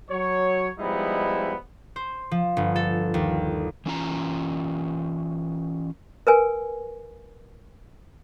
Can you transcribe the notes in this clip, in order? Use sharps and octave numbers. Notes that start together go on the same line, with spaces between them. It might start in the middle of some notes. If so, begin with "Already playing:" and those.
F#3 C#5
F3 G3 G#3 B3 D#4 E4
C5
F3
G1
A4
D#2
E3 C#4 F4 A#5
A#4 B4 G#5